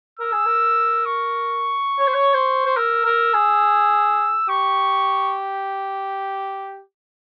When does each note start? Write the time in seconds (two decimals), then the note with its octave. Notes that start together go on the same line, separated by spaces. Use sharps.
0.19 A#4 E6
0.33 G#4
0.46 A#4
1.06 C#6
1.99 C#5
2.08 C5
2.14 C#5
2.34 C5
2.66 C5
2.77 A#4 E6
3.06 A#4
3.34 G#4
4.49 G4 C#6